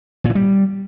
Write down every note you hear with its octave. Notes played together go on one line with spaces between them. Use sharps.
A#2
E3
G3